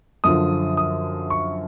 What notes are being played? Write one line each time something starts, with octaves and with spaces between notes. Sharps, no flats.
F#2 D3 F3 D#6
D#6
C#6